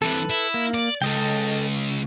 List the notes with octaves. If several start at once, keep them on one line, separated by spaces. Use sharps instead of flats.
C3 E3 A4 B4
E4
A#3
D5
C#2 A4 D#5 G5